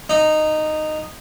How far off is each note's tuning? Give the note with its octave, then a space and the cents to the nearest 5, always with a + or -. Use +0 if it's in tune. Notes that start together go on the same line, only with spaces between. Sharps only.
D#4 -10